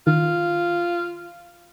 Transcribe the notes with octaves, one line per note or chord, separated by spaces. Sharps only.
D#3 F4